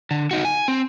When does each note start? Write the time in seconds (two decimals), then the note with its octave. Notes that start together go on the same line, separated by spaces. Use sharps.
0.11 D3
0.31 D#4 F#4
0.45 G#5
0.68 C4